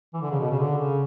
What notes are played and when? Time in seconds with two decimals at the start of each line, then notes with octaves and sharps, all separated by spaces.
0.14 E3
0.22 D3
0.31 C#3
0.40 B2
0.51 C#3
0.59 D3
0.78 C#3